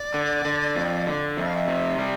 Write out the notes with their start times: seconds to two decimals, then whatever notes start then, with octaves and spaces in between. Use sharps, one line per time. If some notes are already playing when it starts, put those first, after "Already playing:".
Already playing: D5
0.14 D3
0.45 D3
0.75 F2
1.06 D3
1.37 F2 E5
1.46 F5
1.55 E5
1.68 C3
1.98 G3